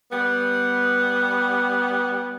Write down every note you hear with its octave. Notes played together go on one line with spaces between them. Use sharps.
G3 B3